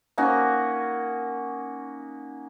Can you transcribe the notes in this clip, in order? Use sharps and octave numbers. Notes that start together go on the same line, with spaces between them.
A#3 C#4 D#4 F#4